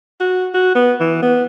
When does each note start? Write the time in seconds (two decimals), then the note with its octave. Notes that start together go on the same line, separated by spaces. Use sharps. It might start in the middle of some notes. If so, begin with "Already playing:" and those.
0.20 F#4
0.54 F#4
0.75 B3
1.00 E3
1.22 B3